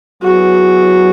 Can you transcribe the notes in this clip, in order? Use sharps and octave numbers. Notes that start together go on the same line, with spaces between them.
F#3 B3 E4 F#4 G#4